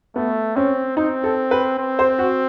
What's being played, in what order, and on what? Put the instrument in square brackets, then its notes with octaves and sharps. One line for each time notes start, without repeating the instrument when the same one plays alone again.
[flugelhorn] A3 [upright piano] B3
[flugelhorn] C4 [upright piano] C#4
[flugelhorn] C4 [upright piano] D#4
[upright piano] A4
B4
[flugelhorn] C4
[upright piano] C5
F#4